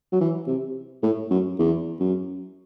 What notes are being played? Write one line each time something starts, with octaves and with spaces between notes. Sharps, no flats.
F#3
E3
C3
A2
F#2
E2
F#2